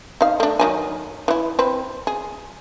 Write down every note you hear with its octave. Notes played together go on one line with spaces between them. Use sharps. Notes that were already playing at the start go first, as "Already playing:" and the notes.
D#4 F5
A3 D4
D#3 F#3 G#5
E3 E4
C4 B4
G#4